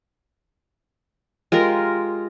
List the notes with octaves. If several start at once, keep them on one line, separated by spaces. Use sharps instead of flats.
G#3 F4 G4 A#4